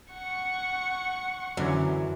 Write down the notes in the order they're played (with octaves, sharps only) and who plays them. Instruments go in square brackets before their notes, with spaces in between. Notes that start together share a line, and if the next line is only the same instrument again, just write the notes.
[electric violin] F#5 C#6
[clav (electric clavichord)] F#2 D3 C#4 [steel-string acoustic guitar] E3 F#3